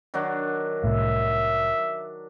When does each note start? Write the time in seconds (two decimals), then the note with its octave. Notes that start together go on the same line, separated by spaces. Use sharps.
0.14 D#3 F#3 D4
0.84 C2 A2 E5